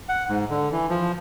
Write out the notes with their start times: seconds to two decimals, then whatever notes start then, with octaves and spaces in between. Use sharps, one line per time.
0.09 F#5
0.29 G#2
0.50 D3
0.72 E3
0.89 F3